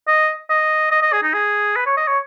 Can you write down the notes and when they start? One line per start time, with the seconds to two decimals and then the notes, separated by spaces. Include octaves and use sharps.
0.08 D#5
0.50 D#5
0.91 D#5
1.02 D#5
1.13 G#4
1.23 D#4
1.33 G#4
1.76 B4
1.86 C#5
1.97 D#5
2.08 C#5